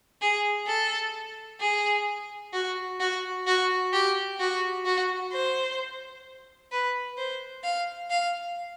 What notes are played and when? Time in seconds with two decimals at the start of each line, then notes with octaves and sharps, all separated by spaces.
0.22 G#4
0.67 A4
1.61 G#4
2.53 F#4
3.00 F#4
3.47 F#4
3.93 G4
4.39 F#4
4.85 F#4
5.32 C5
6.71 B4
7.18 C5
7.63 F5
8.10 F5